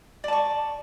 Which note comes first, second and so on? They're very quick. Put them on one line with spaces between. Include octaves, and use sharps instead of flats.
D5 A5 C#6